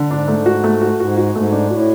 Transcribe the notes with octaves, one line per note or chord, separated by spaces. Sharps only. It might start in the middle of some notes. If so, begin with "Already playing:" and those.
Already playing: D3
G#2 D4
A3
F#4
A3
F#4
G#2 F#4
F#4
G#2 A3
D4
A2 F#4